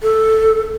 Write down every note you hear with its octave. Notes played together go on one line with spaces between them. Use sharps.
A4